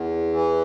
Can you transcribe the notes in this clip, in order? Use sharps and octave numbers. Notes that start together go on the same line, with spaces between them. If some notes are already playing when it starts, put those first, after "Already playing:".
Already playing: E2
E3